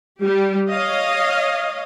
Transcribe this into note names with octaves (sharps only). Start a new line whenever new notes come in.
G3 G4
C#5 D#5 F5